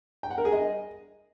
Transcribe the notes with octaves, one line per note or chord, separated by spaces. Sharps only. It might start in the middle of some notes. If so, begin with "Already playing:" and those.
G5
F#5
A#4
G#4
D#5